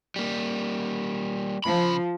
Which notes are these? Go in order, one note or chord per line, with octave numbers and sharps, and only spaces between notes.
G3 A#3
C#3 F3 B5